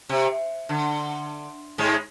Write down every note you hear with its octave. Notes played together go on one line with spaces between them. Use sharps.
C3
D3
G#2 G#3